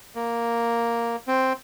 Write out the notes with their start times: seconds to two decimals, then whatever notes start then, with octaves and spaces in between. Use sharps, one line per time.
0.15 A#3
1.28 C4